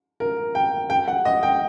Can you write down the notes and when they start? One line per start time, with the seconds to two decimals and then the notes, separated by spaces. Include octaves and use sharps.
0.20 A#4
0.55 G5
0.90 G5
1.08 F#5
1.25 D#5
1.43 G5